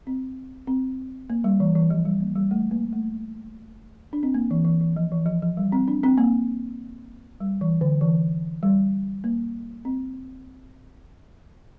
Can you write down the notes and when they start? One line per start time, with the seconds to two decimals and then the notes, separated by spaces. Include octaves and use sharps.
0.07 C4
0.67 C4
1.30 A#3
1.44 G3
1.60 E3
1.75 E3
1.90 F3
2.05 G3
2.20 A#3
2.35 G3
2.51 A3
2.71 A#3
2.93 A3
4.13 D4
4.23 C4
4.34 A#3
4.51 E3
4.65 E3
4.81 E3
4.96 F3
5.12 E3
5.26 F3
5.42 F3
5.57 G3
5.72 C4
5.88 D4
6.04 C4
6.18 A#3
7.40 G3
7.61 E3
7.81 D3
8.01 E3
8.63 G3
9.24 A#3
9.85 C4